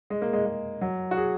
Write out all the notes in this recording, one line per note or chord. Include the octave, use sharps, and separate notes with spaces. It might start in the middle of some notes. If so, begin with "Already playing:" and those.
G#3
A#3
G#3
G#3
F#3
F#4
G#4